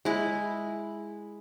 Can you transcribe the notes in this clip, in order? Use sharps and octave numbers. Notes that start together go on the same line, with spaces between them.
G#3 E4